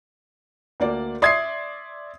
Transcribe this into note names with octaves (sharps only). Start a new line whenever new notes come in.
D2 A#3 D5
D5 E5 C6 D#6 G#6 C7